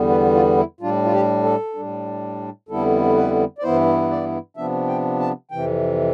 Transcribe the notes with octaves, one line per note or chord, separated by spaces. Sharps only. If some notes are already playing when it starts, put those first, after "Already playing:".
Already playing: E2 D3 G3 B3
B4
F4
E4
A2 G3 D4 F4
F4
G4
A4
A2 G3 D4
F2 D3 G3 B3 E4 A4
B4
D5
G2 E3 B3 E4 C5
D5
C3 F3 B3 D4 E5
G5
A5
F2 C3 E3 G5